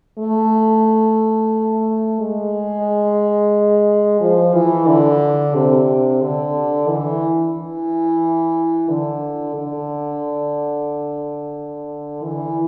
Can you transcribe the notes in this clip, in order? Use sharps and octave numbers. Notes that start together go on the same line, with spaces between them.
A3
G#3
F3
E3
D3
C3
D3
E3
E3
D3
D3
E3